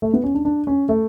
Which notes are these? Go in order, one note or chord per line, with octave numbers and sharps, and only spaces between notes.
A3
B3
C#4
D4
D4
C#4
A3